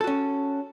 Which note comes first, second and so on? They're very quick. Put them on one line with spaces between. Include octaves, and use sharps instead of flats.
A4 F#4 C#4